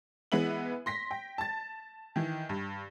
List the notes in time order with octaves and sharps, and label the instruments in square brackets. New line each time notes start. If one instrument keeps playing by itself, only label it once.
[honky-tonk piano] E3 G#3 B3 B4 E5 F#7
C6 A#6 B6
G5
A5 A6
D#3 E3
G2